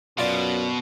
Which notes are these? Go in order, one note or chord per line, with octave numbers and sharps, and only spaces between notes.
F#2 B2 F4 D5